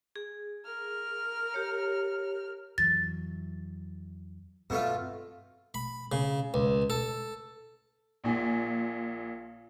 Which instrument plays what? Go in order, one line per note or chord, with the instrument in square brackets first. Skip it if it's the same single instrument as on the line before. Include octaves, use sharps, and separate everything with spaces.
[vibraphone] G#4
[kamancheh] A#4 F6
[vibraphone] G4 C#5
[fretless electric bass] F2 E3 F#3 [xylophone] A6
[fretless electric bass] G2 C4 [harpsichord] B2 A3 F4
[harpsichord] B5
C#3
C#2
A4
[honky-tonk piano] A#1 A#2 G#5